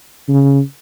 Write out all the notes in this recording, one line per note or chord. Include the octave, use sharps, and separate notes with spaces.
C#3